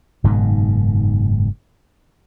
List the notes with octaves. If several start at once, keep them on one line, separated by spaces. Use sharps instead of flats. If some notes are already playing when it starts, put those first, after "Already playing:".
F#1 G#2 B2 D#3